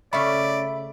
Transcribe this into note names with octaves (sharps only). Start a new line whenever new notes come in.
C#3 A3 D5 E5 B5